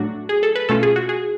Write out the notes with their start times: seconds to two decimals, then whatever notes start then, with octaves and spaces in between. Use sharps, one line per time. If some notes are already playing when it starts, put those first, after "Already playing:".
Already playing: A2 F#3 A3 D4 F#4
0.29 G#4
0.43 A4
0.56 B4
0.69 B2 A3 C#4 F4 A4
0.83 G#4
0.96 F#4
1.09 G#4